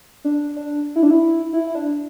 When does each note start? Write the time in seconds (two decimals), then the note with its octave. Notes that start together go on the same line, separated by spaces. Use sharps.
0.25 D4
0.56 D4
0.96 E4
1.03 D4
1.11 E4
1.53 E4
1.67 E4
1.75 D4